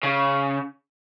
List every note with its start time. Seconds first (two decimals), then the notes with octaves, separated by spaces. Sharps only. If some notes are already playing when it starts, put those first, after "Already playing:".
0.03 C#3